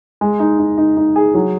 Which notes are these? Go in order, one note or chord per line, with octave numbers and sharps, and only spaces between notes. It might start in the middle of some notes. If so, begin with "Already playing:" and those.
G#3
D#4
D#4
D#4
D#4
G#4
F#3